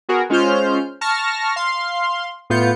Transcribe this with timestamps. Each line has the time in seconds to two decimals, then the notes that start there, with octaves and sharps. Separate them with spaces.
0.09 B3 F#4 G#4 A#4
0.30 G#3 C#4 F4 C5 F6 G6
1.01 A5 C#6 F6 A#6
1.56 F5 C6
2.50 A2 B3 F4 G6 C#7